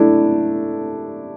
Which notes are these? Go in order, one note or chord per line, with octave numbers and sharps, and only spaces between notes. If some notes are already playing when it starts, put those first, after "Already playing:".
Already playing: A3 D4 E4